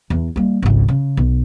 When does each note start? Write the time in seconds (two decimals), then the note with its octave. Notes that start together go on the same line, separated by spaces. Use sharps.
0.10 E2
0.36 G3 A#3
0.62 G#1 C#2
0.88 C#3
1.17 B1